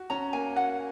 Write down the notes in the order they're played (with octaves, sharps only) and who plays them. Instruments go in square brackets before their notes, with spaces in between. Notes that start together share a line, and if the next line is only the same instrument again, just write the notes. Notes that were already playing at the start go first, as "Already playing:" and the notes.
Already playing: [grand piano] F#4
[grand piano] C#4 [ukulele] A#5
[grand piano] A#3 [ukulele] G#5
[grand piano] F#4 [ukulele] F#5